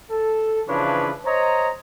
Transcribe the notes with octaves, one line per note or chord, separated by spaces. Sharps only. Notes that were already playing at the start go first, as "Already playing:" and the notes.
A4
C#3 E3 F3 D4 B4 C#5
C5 C#5 D#5 A#5